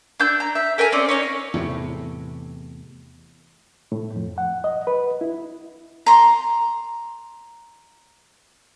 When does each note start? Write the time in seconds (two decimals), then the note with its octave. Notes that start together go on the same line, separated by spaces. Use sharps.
0.20 D4 E6 G6
0.40 A#5
0.55 E5
0.78 A4 A#4 E5 G#5
0.92 C4 C#4 D5 E5
1.08 C#4 D#4 C#5
1.54 E2 A2 C3
3.92 A2
4.16 F2
4.38 F#5
4.64 D#5
4.87 B4
5.21 E4
6.06 A#5 C6